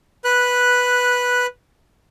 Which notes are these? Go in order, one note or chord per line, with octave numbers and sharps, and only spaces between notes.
B4 F#6